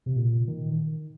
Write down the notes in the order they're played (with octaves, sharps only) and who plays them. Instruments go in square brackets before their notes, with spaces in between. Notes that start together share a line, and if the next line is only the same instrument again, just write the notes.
[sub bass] C3
A#2
D#3